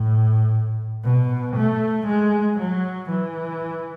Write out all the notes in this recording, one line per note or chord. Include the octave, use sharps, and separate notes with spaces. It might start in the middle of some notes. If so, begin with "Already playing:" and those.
Already playing: A2
B2
A3
G#3
F#3
E3